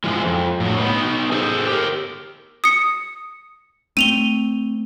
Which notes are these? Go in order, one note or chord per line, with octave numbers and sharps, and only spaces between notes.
G#2 E3 F3 G#3
F2
A2 F#3
B3 D#4
G#4 A4 C5
G4 A#4
D#6 C#7
A3 C4 D#7 F7 G7